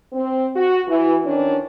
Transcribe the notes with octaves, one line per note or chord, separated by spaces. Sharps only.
C4
F#4
E3
D#3 C#4 D4